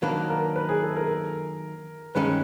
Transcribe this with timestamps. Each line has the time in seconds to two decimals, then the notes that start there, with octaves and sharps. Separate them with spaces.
0.02 D#3 F#3 A#3 D4 B4
0.30 A#4
0.56 B4
0.69 G#4
0.83 A4
0.96 A#4
2.15 G2 D#3 G#3 C#4 B4